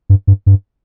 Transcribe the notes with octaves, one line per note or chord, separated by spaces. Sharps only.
G2
G2
G2